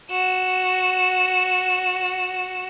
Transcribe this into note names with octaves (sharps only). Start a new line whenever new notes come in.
F#4 E7